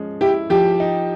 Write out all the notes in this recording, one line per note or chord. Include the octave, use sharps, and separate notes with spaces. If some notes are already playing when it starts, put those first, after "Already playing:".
Already playing: F3 G#3 C#4
E4 G4
F3 G4
D#4